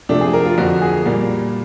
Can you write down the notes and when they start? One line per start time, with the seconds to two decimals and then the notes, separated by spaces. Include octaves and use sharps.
0.09 C3 F3 A3 D4
0.21 G#4
0.33 A#4
0.45 F4
0.58 F2 D3 F3 F#4
0.82 G#4
1.06 A#2 G3 A#3